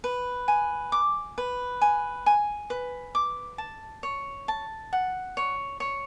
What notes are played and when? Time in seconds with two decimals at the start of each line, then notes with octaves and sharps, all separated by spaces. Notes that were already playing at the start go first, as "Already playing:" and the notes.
0.04 B4
0.48 G#5
0.92 D6
1.38 B4
1.81 G#5
2.26 G#5
2.70 B4
3.15 D6
3.58 A5
4.03 C#5
4.48 A5
4.93 F#5
5.37 C#5
5.80 C#5